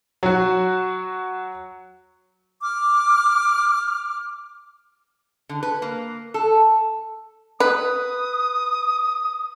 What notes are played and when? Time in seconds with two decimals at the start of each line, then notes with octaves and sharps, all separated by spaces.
0.23 F#3 F#4
2.62 D6 F6
5.49 D3
5.63 B4
5.82 A#3
6.34 A4
7.60 B4 D#6